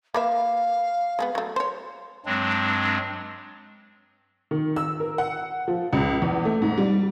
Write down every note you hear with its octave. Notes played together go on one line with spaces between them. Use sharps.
A#3 B4 E5 F5
G#3 A3 B3
F#3 A3
C5 C#5 C6
G2 F#3 G#3 C4 D4
D#3
E6
A#4
F#5
F3
C#2
E2
A3
G#2
G3